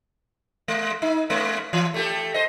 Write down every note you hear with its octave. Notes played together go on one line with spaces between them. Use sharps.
G#3
D#4
G#3 B3 C#4
E3
A3 G4 A4
C5 D#5